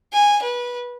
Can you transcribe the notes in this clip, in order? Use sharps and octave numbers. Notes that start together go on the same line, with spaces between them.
G#5
B4